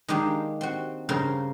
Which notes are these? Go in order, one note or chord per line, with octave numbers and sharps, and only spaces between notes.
D#3 G#3 A#3 D4 G4
C4 F#4
G2 C#3 A#4 C5 F5 C6